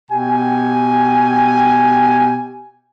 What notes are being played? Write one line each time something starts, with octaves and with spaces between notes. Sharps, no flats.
B2 G4 G5 G#5